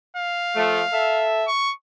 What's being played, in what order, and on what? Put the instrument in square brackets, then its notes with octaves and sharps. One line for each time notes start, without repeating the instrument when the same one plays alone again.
[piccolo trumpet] F5
[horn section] F3 A3
A4 E5
[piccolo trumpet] C#6